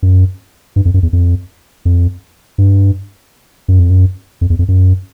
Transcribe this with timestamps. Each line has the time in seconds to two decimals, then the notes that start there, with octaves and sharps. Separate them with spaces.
0.03 F#2
0.76 G2
0.85 F2
0.94 F#2
1.03 E2
1.13 F2
1.85 F2
2.58 G2
3.68 F#2
3.79 F2
3.90 F#2
4.41 F2
4.50 E2
4.59 F2
4.68 F#2